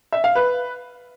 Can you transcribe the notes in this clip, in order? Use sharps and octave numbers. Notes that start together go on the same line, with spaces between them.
E5
F5
B4